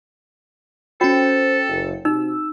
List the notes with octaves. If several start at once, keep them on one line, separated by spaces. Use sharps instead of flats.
C#4 F#4 A4 C5 G5
F#1
C3 D#4 F#4 E6